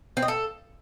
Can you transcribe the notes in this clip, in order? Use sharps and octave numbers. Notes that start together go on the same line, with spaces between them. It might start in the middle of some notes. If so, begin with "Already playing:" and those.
C4
D#5
A4